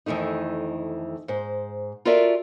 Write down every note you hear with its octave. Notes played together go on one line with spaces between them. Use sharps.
F2 D#3 E3 A3 D#4
G#2 C5
F4 F#4 A4 A#4 D5 E5